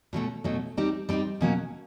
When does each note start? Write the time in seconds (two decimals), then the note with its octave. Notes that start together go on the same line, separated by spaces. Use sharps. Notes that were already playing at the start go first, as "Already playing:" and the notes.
0.13 B2 F#3 A3 C#4
0.44 B2 F#3 A3 C#4
0.77 G3 C4 D#4 G4
1.09 G3 C4 D#4 G4
1.41 B2 F#3 A#3 C#4